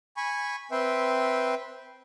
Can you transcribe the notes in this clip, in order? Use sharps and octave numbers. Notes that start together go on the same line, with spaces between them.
G#5 B5 C#6
C4 B4 E5 G5 C6